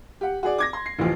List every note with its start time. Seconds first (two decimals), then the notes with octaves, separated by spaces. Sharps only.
0.21 G4 F#5
0.43 F#4 G#4 D5
0.58 D6 G#6 A#6
0.73 C6
0.86 C7
0.99 A1 D2 E3 F3